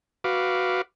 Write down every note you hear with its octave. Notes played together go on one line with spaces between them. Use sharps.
F#4 B4 F5 D6